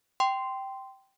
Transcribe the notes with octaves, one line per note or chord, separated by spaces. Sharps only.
G5 C6